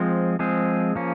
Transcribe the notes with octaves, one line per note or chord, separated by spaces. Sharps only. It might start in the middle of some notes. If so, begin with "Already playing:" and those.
Already playing: F3 G#3 C4
F3 G#3 C4 G#4
F3 A#3 C#4